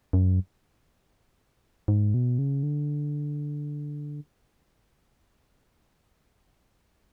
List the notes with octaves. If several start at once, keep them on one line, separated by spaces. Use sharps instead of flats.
F#2
G#2
B2
C#3
D3